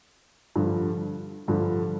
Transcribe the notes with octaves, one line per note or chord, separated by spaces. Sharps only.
G2 D3 F3
G2 D3 F3